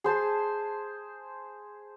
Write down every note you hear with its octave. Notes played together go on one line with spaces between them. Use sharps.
G#4 C5 A5